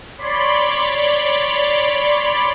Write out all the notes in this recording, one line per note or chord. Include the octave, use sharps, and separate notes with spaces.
C#5 D5 B5 C6